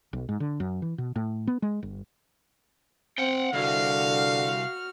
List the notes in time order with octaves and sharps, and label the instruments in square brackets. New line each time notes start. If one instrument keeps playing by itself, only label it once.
[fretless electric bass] B1
G#2
D3
F#2
E3
B2
A2
B3
G#3
G1
[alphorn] C4 [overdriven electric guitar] F#5 G5
[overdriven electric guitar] C2 [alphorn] D3 [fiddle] F#4 F6 [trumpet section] F5